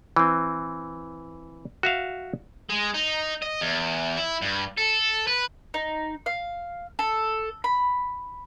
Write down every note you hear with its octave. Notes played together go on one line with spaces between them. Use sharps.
E3 C4
F#4 E5 F5
G#3
D#4
D#5
E2
E4
G2
A4
B4
D#4
F5
A4
B5